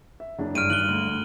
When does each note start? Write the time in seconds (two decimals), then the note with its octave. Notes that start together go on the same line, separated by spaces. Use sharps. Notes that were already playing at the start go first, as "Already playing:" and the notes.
0.20 E5
0.39 F#1 D4
0.55 G2 F6 D7 D#7
0.70 G#1 F#6 F#7 G7
0.88 D2